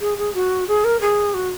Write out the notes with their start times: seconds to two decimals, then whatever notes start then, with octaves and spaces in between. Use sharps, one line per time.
0.01 G#4
0.18 G#4
0.34 F#4
0.68 G#4
0.84 A#4
1.01 G#4
1.34 F#4